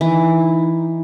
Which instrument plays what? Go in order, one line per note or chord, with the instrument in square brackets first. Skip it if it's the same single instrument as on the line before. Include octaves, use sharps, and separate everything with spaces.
[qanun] E3 [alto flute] D#4